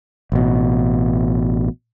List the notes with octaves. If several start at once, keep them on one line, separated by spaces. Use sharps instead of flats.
A1 B2